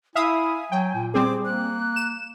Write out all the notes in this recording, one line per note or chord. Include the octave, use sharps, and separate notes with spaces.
E4 E5 F5 G#5 D#6
F#3 G5
A#2
G3 C4 G#4 D6
A#3 F#6
E7